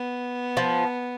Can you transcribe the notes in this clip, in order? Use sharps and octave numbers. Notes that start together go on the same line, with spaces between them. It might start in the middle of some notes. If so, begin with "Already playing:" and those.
Already playing: B3
F3